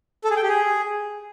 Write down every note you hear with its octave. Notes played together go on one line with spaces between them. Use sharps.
A4
G#4
G5
G4
G#4